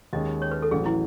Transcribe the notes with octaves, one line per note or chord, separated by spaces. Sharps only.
D#2 D#3 G#3 C#4 D#5
C#5
B4
A4
A1 A2 F#3 G#4
E4